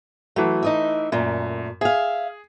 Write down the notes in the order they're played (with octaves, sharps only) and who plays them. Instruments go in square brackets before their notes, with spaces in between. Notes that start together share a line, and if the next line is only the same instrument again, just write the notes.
[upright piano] E3 A3 [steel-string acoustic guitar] F#3
[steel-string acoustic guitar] D#4 D#5 E5
[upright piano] F#2 [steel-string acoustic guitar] A#2 A3
[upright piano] G#4 [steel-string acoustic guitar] E5 F5